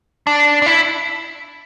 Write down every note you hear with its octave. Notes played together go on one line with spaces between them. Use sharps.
D4
D4
E4